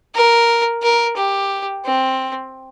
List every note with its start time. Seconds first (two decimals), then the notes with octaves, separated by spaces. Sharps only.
0.15 A#4
0.83 A#4
1.16 G4
1.85 C4